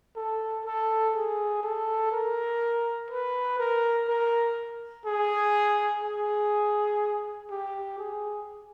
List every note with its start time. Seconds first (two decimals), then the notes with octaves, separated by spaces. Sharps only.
0.16 A4
0.65 A4
1.15 G#4
1.63 A4
2.12 A#4
3.10 B4
3.58 A#4
4.08 A#4
5.06 G#4
6.03 G#4
7.50 G4
7.98 G#4